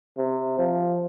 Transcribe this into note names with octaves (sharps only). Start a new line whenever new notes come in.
C3
F3